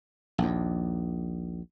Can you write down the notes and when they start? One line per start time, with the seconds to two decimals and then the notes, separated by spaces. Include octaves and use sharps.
0.38 A#1 D#2